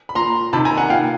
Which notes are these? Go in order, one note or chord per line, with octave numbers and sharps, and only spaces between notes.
B5
A#2 A#5 C6
C3 D#3 A5 B5
G#5 A#5
F#5 G#5
A#2 F5 G5